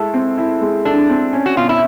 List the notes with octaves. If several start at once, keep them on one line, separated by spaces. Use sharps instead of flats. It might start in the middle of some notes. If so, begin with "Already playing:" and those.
Already playing: G#3 A3 E4 A4
C4
E4
G#3
D4 A4
C4
C#4
F#4
B2 F4
E4